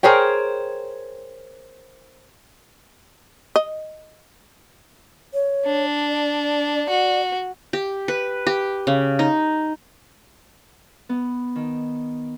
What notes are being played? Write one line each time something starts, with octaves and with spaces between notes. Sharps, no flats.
G#4 A#4 C5 C#5 G5
D#5
C#5
D4
D5
F#4
G4
B4
G4
C#3
D#4
B3
D#3